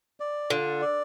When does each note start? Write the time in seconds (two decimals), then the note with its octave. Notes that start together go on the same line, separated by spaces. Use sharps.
0.20 D5
0.50 D3 F4
0.81 D5